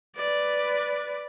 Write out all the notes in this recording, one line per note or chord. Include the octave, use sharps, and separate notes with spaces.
B4 D5